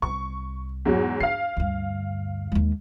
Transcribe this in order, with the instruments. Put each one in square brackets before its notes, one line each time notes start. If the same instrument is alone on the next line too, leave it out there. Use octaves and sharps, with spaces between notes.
[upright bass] C2 [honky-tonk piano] C#6
[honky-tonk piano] E2 G#2 F#3
[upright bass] D4 [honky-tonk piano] F5 C7
[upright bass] D2 G2
D#2 G#3